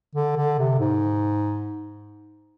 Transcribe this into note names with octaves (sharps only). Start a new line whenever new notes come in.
D3
D3
C3
G#2